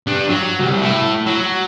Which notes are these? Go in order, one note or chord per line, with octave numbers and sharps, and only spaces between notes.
G2 D4
F#3
C2
A3 E4
F#3